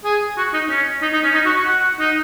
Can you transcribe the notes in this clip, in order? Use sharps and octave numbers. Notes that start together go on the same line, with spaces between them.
G#4
F#4
D#4
C#4
D#4
D#4
C#4
D#4
F#4
F#4
F#5
D#4